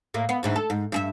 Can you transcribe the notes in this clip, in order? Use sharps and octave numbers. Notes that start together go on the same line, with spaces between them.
A2 A#3
B3
D2 G#2 E3
A4
G#2
G2 G#4 E5